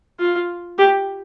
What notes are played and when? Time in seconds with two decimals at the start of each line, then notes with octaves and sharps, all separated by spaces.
0.19 F4
0.79 G4